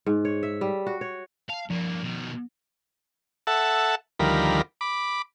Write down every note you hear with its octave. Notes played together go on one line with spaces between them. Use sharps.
G#2
C#5
E5
G3
F#4
C#5
F5 A5
G2 F3 A#3
B2 D#3
A4 E5 F#5 A5
D2 D#3 F3 G3 A#4 B5
B5 D6